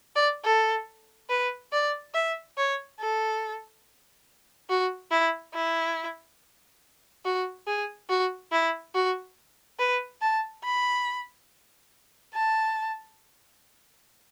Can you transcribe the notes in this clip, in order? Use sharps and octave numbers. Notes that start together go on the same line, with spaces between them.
D5
A4
B4
D5
E5
C#5
A4
F#4
E4
E4
F#4
G#4
F#4
E4
F#4
B4
A5
B5
A5